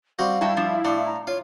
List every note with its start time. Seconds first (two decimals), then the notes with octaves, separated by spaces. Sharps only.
0.19 G3 C4 F#4 F5
0.41 G2 E4 F#4 G5 A5
0.57 F3 D4
0.85 A2 D4
1.06 A#5
1.27 F4 C#5 F5